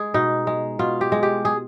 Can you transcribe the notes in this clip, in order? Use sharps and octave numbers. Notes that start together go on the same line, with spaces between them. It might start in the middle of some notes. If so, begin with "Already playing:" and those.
Already playing: G#3 G#4
B2 D#4
G#3
B2 F4
G4
G#3
G4
G#4